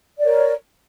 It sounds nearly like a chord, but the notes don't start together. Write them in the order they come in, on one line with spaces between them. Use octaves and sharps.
D5 C#5 A#4